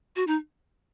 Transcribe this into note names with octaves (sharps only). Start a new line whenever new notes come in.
F#4
D#4